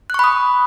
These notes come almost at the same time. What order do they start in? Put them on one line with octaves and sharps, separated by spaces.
F#6 C#6 B5 D#6